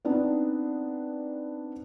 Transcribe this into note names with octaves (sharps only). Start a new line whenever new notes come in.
B3 C4 D4 D#4